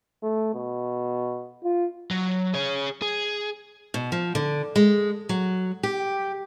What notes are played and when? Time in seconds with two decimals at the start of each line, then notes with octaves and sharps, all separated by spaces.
0.23 A3
0.54 B2
1.64 F4
2.11 F#3
2.54 G#4 C#5
3.02 G#4
3.94 B2
4.12 F3
4.35 D3
4.76 G#3
5.29 F#3
5.83 G4